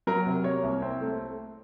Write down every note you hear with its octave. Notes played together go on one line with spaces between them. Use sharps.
F#3 A#4
C3
A#3 C#5
C2
C4
A3